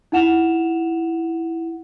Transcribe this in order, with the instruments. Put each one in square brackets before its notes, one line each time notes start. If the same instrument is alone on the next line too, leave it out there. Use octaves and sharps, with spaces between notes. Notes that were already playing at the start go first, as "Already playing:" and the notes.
[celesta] D#4 E4 F#5 E7 F7